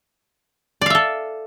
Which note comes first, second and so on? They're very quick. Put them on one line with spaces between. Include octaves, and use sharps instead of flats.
D5 F5 E5 A4